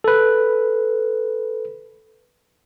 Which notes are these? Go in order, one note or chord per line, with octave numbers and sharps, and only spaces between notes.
A4 B4